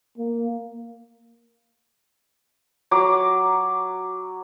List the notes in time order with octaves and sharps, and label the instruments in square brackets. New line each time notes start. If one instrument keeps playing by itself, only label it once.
[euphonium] A#3
[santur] F#3 D6